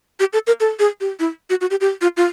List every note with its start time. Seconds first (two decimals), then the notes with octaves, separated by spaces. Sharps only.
0.20 G4
0.33 A4
0.47 A#4
0.60 A4
0.79 G#4
1.01 G4
1.20 E4
1.50 F#4
1.61 F#4
1.71 G4
1.81 G4
2.01 F4
2.17 F4